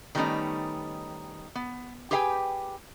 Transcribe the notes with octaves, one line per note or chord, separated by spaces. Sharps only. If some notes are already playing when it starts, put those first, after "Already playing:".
D#3 G3 A3 B3 C#4 D#4
B3
G4 G#4 B4 F5 G5 G#5